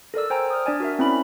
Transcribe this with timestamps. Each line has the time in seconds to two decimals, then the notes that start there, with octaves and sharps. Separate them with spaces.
0.14 A4 A#4 D5 E6
0.30 C5 G5 G#5 A#5
0.50 D#6 F6
0.66 D4 D5 G#5
0.80 F#4 A#4 E5
0.99 C4 C#4 E4 B5